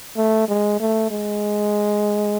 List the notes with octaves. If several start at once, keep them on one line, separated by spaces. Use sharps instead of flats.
A3
G#3
A3
G#3